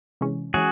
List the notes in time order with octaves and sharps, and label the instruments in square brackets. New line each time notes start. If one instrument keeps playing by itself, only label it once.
[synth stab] C3 E3 G#3 C#4
[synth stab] E3 G#3 C#4 [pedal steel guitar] F#4 G#4